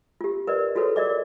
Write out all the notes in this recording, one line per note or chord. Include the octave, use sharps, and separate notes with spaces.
F4 G4
A#4 B4 D5 D#5
F4 F#4 G#4 A4 B4 C#5
A#4 D5 D#5 D6